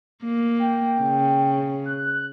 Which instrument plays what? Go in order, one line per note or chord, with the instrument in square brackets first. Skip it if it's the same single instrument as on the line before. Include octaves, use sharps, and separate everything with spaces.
[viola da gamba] A#3
[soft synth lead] G5
[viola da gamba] C#3
[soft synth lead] F#6